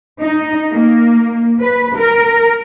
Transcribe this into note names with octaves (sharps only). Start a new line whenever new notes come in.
D#4
A#3
B4
A#4